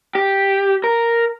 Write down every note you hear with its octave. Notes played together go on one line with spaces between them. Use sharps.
G4
A#4